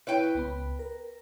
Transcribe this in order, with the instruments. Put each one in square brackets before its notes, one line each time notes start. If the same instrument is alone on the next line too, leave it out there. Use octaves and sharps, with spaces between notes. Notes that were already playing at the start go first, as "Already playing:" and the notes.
[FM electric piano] E4 C#5 E5 [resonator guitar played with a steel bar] B4 G5
[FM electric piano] C#2 B3 B5
A#4